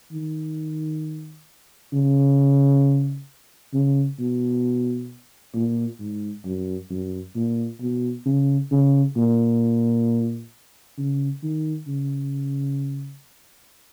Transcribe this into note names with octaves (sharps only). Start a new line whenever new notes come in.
D#3
C#3
C#3
B2
A#2
G#2
F#2
F#2
A#2
B2
C#3
C#3
A#2
C#3
D#3
C#3